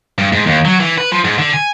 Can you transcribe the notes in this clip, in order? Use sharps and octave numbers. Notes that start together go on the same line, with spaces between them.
G2
G#2
D#2
F#3
E3
B4
F3
G#2
D3
G#5